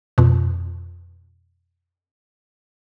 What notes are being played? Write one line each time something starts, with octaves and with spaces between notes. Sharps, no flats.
F2 B2